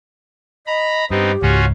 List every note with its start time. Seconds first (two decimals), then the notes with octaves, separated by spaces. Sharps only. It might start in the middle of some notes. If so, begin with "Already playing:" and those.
0.67 D#5 A#5 B5
1.11 G2 B3 C4 D#4 G4
1.42 C#2 G#2 C#4 F4 F#4